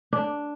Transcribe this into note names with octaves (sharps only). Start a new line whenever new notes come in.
D4